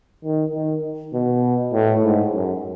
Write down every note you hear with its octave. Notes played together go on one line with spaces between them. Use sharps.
D#3
D#3
B2
A2
G#2
F#2